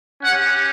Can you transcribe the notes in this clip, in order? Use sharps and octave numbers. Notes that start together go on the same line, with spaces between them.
C#4 G4 F#5